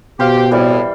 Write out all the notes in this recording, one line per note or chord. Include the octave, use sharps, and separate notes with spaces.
B2 G4 C5 F5
F2 A2 E3 G3